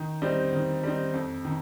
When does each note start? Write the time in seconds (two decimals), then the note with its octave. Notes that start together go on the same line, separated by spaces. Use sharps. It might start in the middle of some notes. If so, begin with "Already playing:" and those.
Already playing: D#3
0.22 G3 C4 D#4
0.52 D#3
0.83 G3 C4 D#4
1.14 F2
1.45 D#3